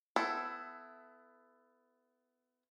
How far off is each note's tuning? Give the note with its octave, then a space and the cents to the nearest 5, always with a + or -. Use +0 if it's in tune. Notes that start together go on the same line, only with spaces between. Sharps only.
B3 +25 E4 +15 A4 -5